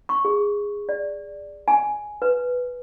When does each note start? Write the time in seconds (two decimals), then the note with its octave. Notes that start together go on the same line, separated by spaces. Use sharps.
0.09 C#6
0.25 G#4
0.89 D5
1.68 G#5
2.22 B4